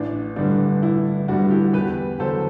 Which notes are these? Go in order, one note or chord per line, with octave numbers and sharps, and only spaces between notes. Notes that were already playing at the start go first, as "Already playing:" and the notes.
Already playing: A1 D4
G2 D3 G3 D4
A1 E4
G2 D3 G3 D4 F#4
E4 G4
E2 G4 B4
D3 F#3 A4 C5